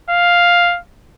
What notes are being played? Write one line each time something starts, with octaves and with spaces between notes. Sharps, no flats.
F5